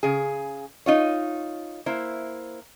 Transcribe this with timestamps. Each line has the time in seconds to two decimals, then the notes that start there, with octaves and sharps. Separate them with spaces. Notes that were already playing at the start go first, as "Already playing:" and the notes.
0.03 C#3 G#4
0.86 D#4 F4 C#5
1.86 A#3 E4 C5